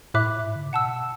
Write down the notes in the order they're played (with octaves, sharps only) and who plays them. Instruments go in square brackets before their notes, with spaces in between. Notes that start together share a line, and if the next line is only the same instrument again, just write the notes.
[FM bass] A2 [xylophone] E5 B5 D6 F#6
[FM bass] G#2
D3
C#3
[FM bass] B2 [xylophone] F#5 A5 E6